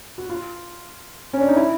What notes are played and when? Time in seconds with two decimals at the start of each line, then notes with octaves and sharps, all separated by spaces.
0.18 F#4
0.29 F4
1.33 C#4
1.41 D4
1.48 D#4
1.56 E4